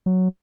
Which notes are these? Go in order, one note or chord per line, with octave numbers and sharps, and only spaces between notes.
F#3